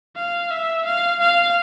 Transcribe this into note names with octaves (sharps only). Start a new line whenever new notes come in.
F5
E5
F5
F5